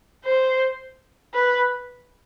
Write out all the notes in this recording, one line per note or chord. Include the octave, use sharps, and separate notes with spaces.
C5
B4